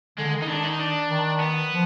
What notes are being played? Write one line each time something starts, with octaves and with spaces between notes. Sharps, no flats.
D3 G#3
D#3
D#4
D4
D#4
D4
D#3
B3
F3